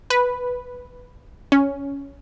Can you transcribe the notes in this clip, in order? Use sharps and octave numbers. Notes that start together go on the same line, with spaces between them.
B4
C#4